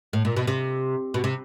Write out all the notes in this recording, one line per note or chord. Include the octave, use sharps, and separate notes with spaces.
A2
A#2
B2
C3
B2
C3